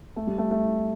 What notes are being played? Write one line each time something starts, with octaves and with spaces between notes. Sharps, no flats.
A3
G3
A3
A3